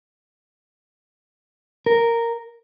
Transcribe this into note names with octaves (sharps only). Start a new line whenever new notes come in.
A#4